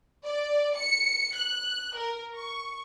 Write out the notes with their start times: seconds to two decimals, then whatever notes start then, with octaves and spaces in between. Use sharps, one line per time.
0.24 D5
0.76 C#7
1.35 F#6
1.97 A#4
2.34 C#6